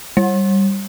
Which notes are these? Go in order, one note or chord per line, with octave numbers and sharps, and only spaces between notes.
G3